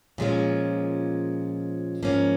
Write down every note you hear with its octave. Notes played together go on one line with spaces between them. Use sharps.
A#2 F3 G#3 C#4
G#2 F3 A#3 C#4